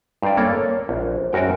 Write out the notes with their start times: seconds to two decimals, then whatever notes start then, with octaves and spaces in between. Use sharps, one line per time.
0.22 G2 C5 D5
0.37 A#3 A4 C#5
0.54 C#5
0.89 A#1
1.33 F#2 F#4 A#4 G5